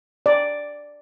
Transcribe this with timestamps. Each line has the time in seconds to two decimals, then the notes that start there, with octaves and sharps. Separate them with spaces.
0.26 D5